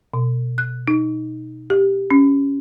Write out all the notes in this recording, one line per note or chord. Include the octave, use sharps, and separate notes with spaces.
B2
F#6
D#4
G4
C#4